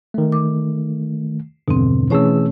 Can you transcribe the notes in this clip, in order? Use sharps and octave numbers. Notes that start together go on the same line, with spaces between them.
D#3 A3
D6
E2 G2 B2 D3 C4
E3 A3 C#4 G#4 C#5 E6